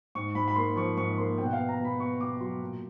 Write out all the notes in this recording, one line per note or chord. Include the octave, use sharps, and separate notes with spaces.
G#2 C#6
G#2 B5
B5
A#3 C6
F3 C#6
G#2 C#6
A#3 C6
B2 G5
F#5
F5
B3
A#5
B2 B5
B3 C#6
B2 D6
F#3 C6
A#2